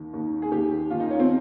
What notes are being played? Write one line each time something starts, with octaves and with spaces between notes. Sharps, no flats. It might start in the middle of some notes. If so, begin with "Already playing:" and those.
Already playing: D#2 D#3
D#2 D#3
G#4
D#2 D#3 G4
D#2 D#3 F4
D#4
C#4
C4